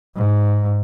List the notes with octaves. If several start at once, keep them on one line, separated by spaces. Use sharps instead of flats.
G#2